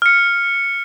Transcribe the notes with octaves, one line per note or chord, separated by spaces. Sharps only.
F6 C#7